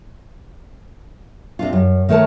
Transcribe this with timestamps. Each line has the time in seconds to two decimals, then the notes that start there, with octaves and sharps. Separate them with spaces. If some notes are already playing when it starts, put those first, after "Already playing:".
1.59 C3 D4 F4
1.73 F#2
2.09 D#3 A3 A#4 C#5 A5